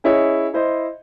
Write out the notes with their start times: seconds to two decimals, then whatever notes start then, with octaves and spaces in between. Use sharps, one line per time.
0.04 C#4 E4 G#4 C#5 D#5
0.54 E4 C5 D#5